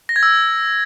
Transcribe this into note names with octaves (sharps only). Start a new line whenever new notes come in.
A#6
G#6
E6